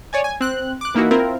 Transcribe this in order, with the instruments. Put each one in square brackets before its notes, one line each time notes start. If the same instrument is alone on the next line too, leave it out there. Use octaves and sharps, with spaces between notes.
[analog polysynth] C#5 D5 G#5
G#5
C4 F#6
D6 F#6
E3 A#3 D#4 E4 F#4
C4 E4 F4 A#4